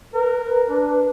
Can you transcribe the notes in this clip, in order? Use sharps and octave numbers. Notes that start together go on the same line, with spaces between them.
A#4 B4
D4